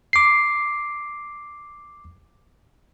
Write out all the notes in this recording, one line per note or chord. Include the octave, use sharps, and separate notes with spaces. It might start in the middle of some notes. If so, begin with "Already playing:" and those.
D6 C7